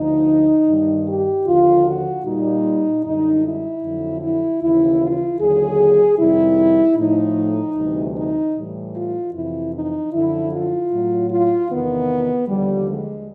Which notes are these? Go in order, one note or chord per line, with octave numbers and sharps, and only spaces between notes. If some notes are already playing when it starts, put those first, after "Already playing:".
Already playing: D2 D3 F3 D#4
G2 D#3 G3
G4
D#2 D3 F3 F4
F#4
A#2 G3 D#4
F#2 D3 G3 D#4
E4
F2 D3 F#3
E4
D#2 C#3 E3 E4
F4
D#2 D3 F#3 G#4
F2 C3 D#3 G3 E4
A2 F3 D#4
D2 C3 E3 G3
D#4
A2 E3 G3
F4
F2 C3 E3 E4
D#4
F#2 D3 F3 E4
F4
A2 F#3
F4
E2 C3 D#3 B3
D#2 D3 F3 G3
G#3